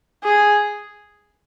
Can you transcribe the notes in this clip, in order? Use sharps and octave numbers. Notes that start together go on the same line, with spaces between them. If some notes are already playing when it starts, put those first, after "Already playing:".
G#4